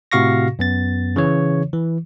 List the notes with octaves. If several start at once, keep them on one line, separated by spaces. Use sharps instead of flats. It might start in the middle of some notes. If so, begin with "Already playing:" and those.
A2 C3 F#4 F5 C#6 A#6
F#2 B3 A6
C#3 E3 C#5
E3